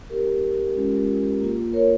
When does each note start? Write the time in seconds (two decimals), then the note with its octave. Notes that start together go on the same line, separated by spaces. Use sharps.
0.10 G3 A#3 D#4 G4 A#4
0.75 G#3 C#4 F4
1.40 A#3 F4
1.73 A#4 C#5